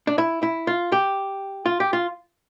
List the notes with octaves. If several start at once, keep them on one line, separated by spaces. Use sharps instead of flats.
D4
E4
E4
F4
G4
F4
G4
F4